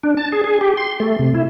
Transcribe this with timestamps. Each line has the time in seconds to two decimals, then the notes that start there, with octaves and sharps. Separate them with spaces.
0.03 D4
0.17 A5
0.32 G#4
0.44 G#4
0.61 G4
0.77 C6
1.00 A3
1.19 C3
1.34 E4